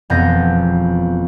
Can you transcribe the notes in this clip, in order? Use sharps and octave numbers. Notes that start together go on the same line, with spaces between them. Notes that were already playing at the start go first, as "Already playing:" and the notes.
E1 F2 B3 G6 A#6